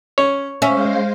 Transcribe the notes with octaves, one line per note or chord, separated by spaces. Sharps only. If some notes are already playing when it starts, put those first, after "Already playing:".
C#4 C#5
G#3 C#4 C5 E5 F5